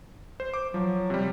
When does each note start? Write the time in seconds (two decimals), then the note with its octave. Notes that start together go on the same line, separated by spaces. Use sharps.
0.40 C5
0.54 D6
0.74 F3 F#3
1.10 C3 G3